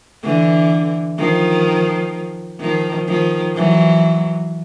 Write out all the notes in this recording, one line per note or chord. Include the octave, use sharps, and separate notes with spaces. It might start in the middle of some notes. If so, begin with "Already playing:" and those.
D3 E3
D#3 F3
D#3 F3
D#3 F3
E3 F#3